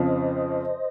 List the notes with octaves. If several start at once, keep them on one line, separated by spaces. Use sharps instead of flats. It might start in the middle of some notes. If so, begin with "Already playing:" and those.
Already playing: F2 C#3 F3 C5 D#5